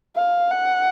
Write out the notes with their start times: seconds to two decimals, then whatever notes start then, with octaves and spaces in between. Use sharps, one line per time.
0.16 F5
0.51 F#5